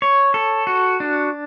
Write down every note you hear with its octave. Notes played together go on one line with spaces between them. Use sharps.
C#5
A4
F#4
D4